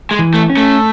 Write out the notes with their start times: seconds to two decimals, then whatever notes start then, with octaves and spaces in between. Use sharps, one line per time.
0.11 G#3
0.19 E3
0.34 A3
0.50 C#4
0.57 A3